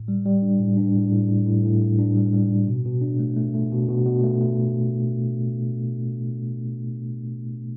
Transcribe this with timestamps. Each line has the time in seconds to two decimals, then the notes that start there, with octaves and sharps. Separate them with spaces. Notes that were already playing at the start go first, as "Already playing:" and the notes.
Already playing: A2
0.08 G3
0.25 G3
0.42 D4
0.60 A2
0.77 D4
0.94 A2
1.12 A2
1.29 A2
1.46 A2
1.64 A2
1.82 A2
1.99 D4
2.15 G3
2.33 G3
2.51 A2
2.68 B2
2.85 B2
3.02 D4
3.19 A3
3.36 A3
3.54 A3
3.72 B2
3.88 B2
4.06 B2
4.23 A3
4.41 A3